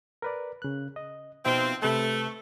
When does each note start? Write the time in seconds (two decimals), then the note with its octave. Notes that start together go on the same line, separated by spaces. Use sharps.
0.22 A#4 B4 D5
0.62 C#3 F#6
0.96 D#5
1.45 B2 F3 C4 D#4 E5
1.82 C3 A3 B4 A5